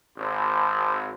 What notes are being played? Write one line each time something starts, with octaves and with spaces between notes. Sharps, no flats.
G#1